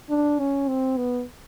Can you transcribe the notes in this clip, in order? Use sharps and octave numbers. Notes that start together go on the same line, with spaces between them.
D4
C#4
C4
B3